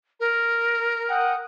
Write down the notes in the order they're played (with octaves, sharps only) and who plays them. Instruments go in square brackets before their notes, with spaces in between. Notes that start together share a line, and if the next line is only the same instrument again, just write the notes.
[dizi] A#4
[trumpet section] F#5 G5 D#6